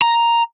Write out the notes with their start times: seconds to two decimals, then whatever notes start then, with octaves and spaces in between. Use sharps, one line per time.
0.02 A#5